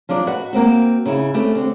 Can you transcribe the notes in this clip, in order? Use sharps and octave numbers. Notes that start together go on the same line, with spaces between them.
F3 F#3 D4 D5
F#4 B4 D#5 F#5
A#3 C4 F#4
C#3 D#4 E4
A3 C4 C#4 G4 B4
D3 C4